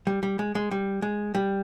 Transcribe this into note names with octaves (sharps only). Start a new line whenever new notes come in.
G3
G3
G#3
G#3
G3
G#3
G3